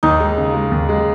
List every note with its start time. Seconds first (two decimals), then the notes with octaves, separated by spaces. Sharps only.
0.03 D#2 D#4
0.20 G#3
0.37 C#3
0.54 G#3
0.71 D#2
0.89 G#3